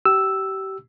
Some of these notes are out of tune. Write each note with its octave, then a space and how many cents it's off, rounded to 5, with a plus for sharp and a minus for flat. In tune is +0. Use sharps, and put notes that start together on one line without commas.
G4 -30 E6 +0